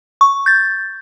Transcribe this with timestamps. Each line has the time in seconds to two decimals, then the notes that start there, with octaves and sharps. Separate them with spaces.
0.21 C#6
0.46 G6 A6